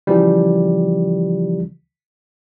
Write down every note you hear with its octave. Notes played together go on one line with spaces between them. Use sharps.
C#3 E3 F3 G3